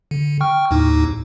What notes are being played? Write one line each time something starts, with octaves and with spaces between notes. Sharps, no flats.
D3
G5 C#6 F6
D#2 A2 D#4